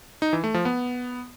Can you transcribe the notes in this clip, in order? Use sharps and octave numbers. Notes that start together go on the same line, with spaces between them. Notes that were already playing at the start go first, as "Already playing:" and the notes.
D#4
E3
A3
F3
B3